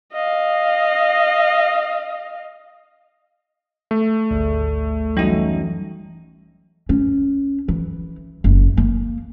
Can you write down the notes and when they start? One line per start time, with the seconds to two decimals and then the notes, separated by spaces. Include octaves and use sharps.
0.13 D#5 F5
3.91 A3
4.31 G#1 D2
5.17 F#2 E3 G3 D#4
6.89 C#4
7.68 E3
8.44 F#1
8.77 A#3